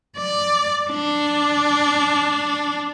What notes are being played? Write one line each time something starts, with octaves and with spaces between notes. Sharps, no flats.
D5
D4